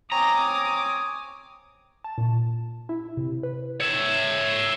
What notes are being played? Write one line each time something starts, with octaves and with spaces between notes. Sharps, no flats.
C4 C#5 G#5 A#5 D6 D#6
A5
A#2
E4
C3
B4
C#5 E5